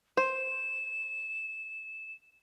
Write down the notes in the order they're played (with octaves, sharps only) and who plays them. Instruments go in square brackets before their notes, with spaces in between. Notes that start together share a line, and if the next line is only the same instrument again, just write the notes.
[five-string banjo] C5 [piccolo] E7